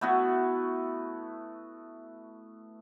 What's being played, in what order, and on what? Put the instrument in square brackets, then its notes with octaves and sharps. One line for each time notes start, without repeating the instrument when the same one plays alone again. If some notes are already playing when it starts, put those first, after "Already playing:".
[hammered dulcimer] A3 B3 E4 F#4